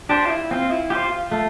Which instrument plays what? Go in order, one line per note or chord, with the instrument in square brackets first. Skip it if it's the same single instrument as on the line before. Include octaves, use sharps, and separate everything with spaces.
[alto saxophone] D4 [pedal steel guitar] G4 C5
[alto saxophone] F4
E4
[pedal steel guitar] C4 [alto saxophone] F4
[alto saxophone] E4
[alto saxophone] F4 [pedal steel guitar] G4 C5
[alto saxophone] F4
[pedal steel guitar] A3 [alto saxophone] F4